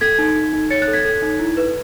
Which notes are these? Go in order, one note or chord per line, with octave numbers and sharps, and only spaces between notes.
A4 G#6 B6
D#4
D#4
D#4
C#5 A6 C#7
F#6 A6
A4
G#6 B6
A4
D#4
E4
B4